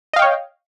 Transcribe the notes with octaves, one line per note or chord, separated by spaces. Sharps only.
C#5 D#5 F5 G5